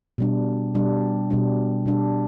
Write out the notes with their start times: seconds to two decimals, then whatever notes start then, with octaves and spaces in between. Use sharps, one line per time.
0.18 B2 G3 D4
0.74 B2 G3 D4
1.30 B2 G3 D4
1.85 B2 G3 D4